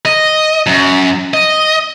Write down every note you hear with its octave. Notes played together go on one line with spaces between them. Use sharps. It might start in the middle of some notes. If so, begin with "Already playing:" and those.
D#5
F#2
D#5